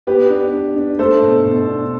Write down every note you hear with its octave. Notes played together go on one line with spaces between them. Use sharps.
B3 G4 B4
D4
D4
D4
A3 A4 C5
B2
B2
D4